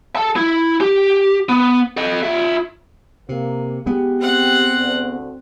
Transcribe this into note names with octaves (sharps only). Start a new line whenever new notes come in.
A4 A5
E4
G4
B3
A4 D#5
F4 E5
C3 A#3
G#3 B3 G4
C4 F#5
D2